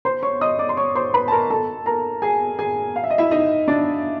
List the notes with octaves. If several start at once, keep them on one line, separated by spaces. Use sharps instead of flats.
C5 C6
C#5 C#6
D#5 D#6
D5 D6
C6
C#5 C#6
C5 C6
B4 B5
A5
A#4 A#5
A4 A5
A#4 A#5
G#4 G#5
G#4 G#5
F5
E5
D#5
E4 E5
D#4 D#5
D4 D5